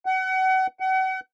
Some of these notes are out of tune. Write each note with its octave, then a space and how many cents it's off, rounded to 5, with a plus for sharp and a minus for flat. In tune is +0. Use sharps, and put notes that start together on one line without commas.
F#5 +30
F#5 +35